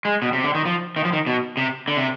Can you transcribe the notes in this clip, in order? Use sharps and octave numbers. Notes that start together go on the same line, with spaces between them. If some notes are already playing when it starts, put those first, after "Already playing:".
G#3
B2
C3
D3
D#3
F3
D#3
F3
D#3
B2
C3
D3
C3